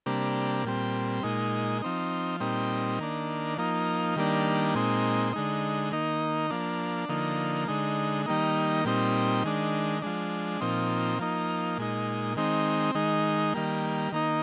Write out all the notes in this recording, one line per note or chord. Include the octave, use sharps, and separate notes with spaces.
C3 G3 A#3 D4
A#2 G3 C4
A#2 G#3 D#4
F3 C4 D#4
A#2 G3 C4 D#4
D#3 A#3 D4
F3 A#3 D#4
D#3 G3 A#3 D4
A#2 G#3 C4 D#4
D3 G#3 D#4
D#3 A#3 D#4
F3 A#3 D4
D3 F3 A#3 D#4
D3 G#3 D#4
D#3 G3 A#3 D#4
A#2 G3 C4 D#4
D#3 G#3 D4
F3 G#3 D4
A#2 F3 C4 D#4
F3 A#3 D#4
A#2 G#3 D#4
D#3 G#3 C4 D#4
D#3 G#3 D#4
D#3 G3 A#3
D#3 A#3 D#4